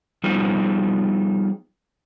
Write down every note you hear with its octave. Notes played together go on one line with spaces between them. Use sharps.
F3 G3 B3 D#4 F4 G#4